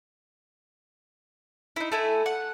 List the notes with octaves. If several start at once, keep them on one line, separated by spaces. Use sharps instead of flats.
D#4 E4
A3 E4 G#5
F#5